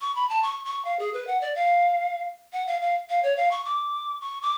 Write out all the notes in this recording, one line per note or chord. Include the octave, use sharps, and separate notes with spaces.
C#6
B5
A5
C#6
C#6
F5
G#4
B4
F#5
D5
F5
F#5
F5
F5
F5
C#5
F5
C#6
D6
C#6
D6